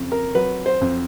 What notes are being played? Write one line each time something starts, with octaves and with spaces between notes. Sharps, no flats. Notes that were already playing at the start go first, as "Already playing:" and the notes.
Already playing: F2 C#3
A#4
F#3 B4
C5
F2